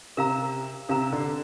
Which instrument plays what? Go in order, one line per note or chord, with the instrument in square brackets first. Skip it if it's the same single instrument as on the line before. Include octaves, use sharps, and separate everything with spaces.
[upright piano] C3 [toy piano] A#4 F5 A#5
[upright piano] C3 [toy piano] A#4 F5 A#5
[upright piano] D3